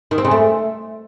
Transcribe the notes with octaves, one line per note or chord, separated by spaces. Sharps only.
D#3
C4
C#3
A3